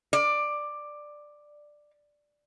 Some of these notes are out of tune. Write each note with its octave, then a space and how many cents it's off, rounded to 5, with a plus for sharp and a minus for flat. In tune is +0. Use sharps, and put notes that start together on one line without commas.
D5 +10